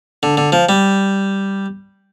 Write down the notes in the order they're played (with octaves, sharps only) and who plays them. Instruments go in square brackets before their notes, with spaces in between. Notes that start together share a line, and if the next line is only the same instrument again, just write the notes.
[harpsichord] D3
D3
F3
G3